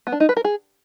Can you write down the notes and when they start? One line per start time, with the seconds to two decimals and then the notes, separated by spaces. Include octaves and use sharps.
0.07 B3
0.12 D4
0.20 D#4
0.29 B4
0.37 A#4
0.45 G#4